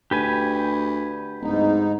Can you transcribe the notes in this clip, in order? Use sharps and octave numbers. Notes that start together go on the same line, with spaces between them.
D2 G4 B4 G#5
D1 G#2 D#4